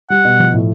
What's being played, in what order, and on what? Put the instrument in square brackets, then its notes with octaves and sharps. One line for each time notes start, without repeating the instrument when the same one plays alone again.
[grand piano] G3 [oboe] F#5
[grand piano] B2
F3
A2